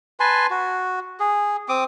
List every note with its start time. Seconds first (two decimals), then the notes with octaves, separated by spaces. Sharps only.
0.20 B4 G#5 A5 C6
0.50 F#4
1.20 G#4
1.69 C4 D6 D#6